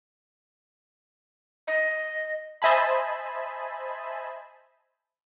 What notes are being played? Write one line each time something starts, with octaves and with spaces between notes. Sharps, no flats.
D#5
C5 D#5 E5 G#5 A5 B5